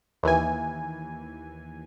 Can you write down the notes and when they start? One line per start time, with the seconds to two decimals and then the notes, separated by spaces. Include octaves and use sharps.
0.23 D#2 E3 G#5